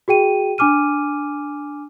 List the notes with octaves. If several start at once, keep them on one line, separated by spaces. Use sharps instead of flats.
F#4 G#4 G5 D#7
D4 G#5 D6 F6 D#7